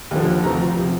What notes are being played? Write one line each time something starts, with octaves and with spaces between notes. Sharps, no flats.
D#2 D3 F3
D2 C3 F3 A#5
C3 F3